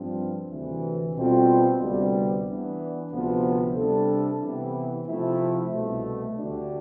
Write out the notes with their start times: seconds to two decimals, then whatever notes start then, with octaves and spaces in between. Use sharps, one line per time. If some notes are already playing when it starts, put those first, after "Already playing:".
Already playing: G2 F3 C4
0.50 D2 C3 E3
1.15 B2 G3 C4 F4 A4
1.80 D2 C3 G3 B3
2.45 E3 B3 D4
3.11 D2 C3 F3 B3
3.76 C3 G3 D4 A4
4.41 C3 E3 B3 E4 G4
5.07 C3 F3 A3 E4
5.72 C2 B2 A3
6.37 D2 D3 A3 D4 G4